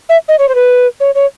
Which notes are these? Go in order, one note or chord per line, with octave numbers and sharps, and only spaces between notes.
E5
D#5
C#5
C5
B4
C#5
C#5